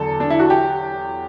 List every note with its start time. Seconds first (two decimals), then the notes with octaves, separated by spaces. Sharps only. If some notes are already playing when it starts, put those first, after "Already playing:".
Already playing: E2 D3 F#3 A4
0.20 D4
0.30 E4
0.40 F#4
0.50 G4